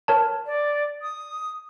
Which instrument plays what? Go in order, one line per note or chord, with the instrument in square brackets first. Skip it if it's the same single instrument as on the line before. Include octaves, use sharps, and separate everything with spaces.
[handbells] A#4 C#5 A5
[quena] D5
D#6